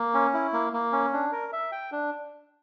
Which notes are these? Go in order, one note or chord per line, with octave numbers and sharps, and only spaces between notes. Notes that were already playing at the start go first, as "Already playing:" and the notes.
Already playing: A#3
C#4
E4
A#3
A#3
C#4
D4
A#4
E5
G5
D4